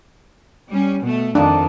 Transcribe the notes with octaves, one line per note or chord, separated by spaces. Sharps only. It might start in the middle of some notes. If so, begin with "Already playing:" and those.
G3 C#4
B2 A3
F2 D#3 D4